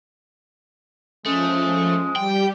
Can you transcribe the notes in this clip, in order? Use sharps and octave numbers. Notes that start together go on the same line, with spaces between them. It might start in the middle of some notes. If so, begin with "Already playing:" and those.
F3 G#3 A3 C#4
G3 G4 G5